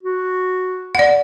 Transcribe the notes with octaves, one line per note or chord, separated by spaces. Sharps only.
F#4
D5 F#5